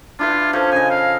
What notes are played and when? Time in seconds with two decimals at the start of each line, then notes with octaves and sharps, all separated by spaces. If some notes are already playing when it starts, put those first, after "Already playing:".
0.19 D4 E4 F4 B4
0.53 F3 C#4 A4 C5
0.72 C#3 D#5 G#5
0.90 F5